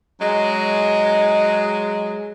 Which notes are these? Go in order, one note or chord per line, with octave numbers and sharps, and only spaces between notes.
F#3 G#3